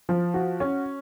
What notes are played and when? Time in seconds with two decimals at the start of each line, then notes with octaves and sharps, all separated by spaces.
0.09 F3
0.34 F#4
0.60 C#4